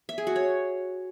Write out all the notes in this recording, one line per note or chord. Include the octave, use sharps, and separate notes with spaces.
E5
G#4
F#4
C#5